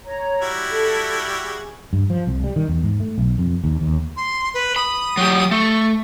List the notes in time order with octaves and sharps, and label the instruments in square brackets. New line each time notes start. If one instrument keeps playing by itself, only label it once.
[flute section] C#5 A#5
[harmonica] G3 E4 F#4
[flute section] A4
G#4
[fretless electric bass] G2
F3
C2
G3
D#3
E2
G#2
A3
B1
F2
D#2
D#2
[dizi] C6
B4
[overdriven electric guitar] B5 [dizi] D#6
[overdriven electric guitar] F#3 G4
[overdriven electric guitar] A3 [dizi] C#6